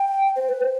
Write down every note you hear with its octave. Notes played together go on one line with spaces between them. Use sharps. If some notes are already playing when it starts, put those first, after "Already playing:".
Already playing: G5
C5
B4
C5